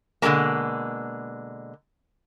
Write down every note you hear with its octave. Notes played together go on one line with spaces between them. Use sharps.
B2 D3 F3 G#3 A#3